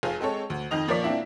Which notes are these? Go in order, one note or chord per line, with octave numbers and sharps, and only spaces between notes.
F1 F4 G#4
G#3 C4 A4 C#5
D2
F2 D#3 D#5 F7
A#2 F3 A#4 C#5 D5 B6
A#3 C4 D4 E4